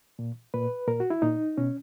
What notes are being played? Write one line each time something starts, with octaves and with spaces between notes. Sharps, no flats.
A#2
A#2 B4
A#2 A#4
F#4
E4
A#2 D#4
B2 C#4